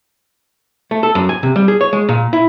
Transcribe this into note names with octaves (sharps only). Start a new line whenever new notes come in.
A3
A4
F#2
G#5
C3
G3
G#4
C#5
G#3
A#2
E4